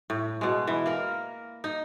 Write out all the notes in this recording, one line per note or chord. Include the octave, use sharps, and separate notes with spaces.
A2
B2 G#3
E3
A#3 A#4
D#4